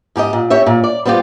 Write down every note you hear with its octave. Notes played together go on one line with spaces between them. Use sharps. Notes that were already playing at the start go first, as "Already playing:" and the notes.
G#2 G4 G#4 D#5
A#2
G4 C#5 E5
A#2
D5
G3 B3 C4 F4 G4